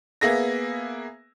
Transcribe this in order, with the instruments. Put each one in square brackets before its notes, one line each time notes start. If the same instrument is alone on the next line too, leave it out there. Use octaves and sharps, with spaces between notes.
[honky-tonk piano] A#3 B3 G#4 E5 A#6